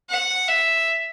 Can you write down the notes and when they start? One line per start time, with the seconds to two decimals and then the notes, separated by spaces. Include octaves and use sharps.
0.09 F#5
0.48 E5